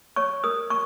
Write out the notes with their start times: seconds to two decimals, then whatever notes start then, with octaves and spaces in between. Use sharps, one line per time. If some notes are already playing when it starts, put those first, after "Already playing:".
0.16 C#5 C#6
0.44 A#4 D#6
0.70 C#6